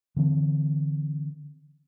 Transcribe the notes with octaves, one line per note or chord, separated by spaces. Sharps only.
D3 E3 C4